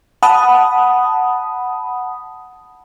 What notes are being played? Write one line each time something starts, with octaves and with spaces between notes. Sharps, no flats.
F#5 A5 B5 D#6